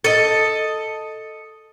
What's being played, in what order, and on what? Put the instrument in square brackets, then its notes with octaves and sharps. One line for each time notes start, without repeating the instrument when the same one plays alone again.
[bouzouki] A4 D#5